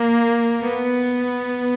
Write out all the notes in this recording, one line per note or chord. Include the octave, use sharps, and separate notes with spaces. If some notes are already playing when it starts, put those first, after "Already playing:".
Already playing: A#3
B3